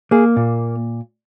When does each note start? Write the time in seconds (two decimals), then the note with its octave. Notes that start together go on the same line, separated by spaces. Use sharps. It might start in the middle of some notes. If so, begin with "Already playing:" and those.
0.11 A#3 G#4
0.36 A#2